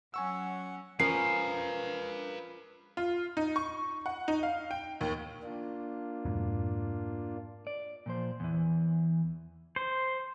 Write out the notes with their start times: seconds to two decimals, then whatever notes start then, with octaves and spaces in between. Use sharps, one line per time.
0.14 F#3 C#4 F#5 G#5 C#6 E6
1.00 F3 C#4 A#4 B4 F5 G#5 C7
2.97 F4
3.37 D#4
3.56 C#6
4.06 F#5
4.28 D#4
4.43 F5
4.71 G5
5.01 D#2
5.43 A#3 D4 F4
6.25 F2 G#2 B2
7.67 D5
8.06 A#2 F3 C5
8.40 E2 E3
9.76 C5